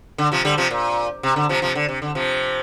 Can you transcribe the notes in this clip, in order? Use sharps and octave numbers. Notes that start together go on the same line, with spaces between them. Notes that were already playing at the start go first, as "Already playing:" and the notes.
D3
C3 F3
D3 G3
C3 F3
A#2
C3
D3
C3 F3
C3 F3
D3
C3
D3
C3 F3